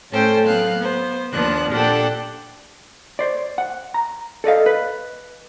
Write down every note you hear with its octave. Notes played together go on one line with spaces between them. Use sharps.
A2 A3 C#4 A4 C5 G5
F#3 B3 F5 F#6
B3 C5
D#2 F3 B3 D4 F#6
A#2 D4 G4 A4 F#5 G5
C5 D5
F#5
A#5
A4 D5 D#5 F5
B4